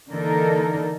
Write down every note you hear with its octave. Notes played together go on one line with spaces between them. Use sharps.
D3 E3 A#3 D#4 A4 A#4